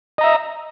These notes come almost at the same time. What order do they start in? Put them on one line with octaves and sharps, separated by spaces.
D#5 A#5 E5